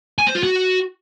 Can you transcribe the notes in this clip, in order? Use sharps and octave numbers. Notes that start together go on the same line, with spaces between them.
G#5
C5
F4
F#4